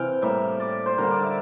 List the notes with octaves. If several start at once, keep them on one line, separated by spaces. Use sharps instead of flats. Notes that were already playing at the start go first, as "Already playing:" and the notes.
Already playing: C3 E3 F5 G5
A2 G3 A#3 E5
D5
C5
D3 G3 A#3 A#4
D5
E5